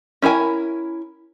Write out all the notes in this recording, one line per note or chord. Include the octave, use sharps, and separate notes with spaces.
C#4 E4 A#4 G#5